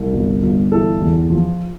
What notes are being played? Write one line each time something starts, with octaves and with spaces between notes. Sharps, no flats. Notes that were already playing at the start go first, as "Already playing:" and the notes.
Already playing: C2
G1
G1
E3 A4
E2
F3